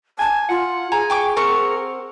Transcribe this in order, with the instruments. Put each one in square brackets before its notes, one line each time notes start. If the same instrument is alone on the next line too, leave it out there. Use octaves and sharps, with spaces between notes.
[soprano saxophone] G#5 [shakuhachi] A5
[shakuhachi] F4 [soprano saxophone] F#5
[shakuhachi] G#4 [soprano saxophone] G#5 [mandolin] A#5
[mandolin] G5 C#6 D6
[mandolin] C4 F#4 C#6 [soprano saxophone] A#4